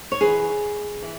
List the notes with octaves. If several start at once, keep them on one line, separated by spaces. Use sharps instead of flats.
C#5
F#2 E3 G#4 B4
E3